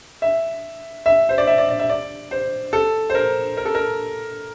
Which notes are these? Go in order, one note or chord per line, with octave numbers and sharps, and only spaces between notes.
E5
E5
C5
D5
E5
D5
D5
E5
D5
C5
A4
C5
A#4
A#4
A4
A#4